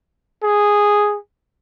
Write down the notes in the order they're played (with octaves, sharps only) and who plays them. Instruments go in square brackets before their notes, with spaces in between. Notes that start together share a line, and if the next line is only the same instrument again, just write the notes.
[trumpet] G#4